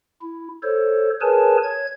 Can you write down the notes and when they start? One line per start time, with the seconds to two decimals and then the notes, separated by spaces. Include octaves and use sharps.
0.22 E4
0.63 A4 C5 C#5
1.21 G#4 A#4 B4 C#5 G#5 A5
1.63 C#5 G#6